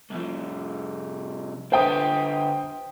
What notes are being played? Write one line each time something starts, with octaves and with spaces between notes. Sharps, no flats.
C2 F3
D3 B4 C5 G5 D#6